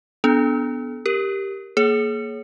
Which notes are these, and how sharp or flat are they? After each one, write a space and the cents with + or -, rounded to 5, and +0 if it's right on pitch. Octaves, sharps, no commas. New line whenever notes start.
B3 +0 D4 -15 A4 -30
G4 +0 A#4 +0
A#3 +0 G#4 +30 C#5 +0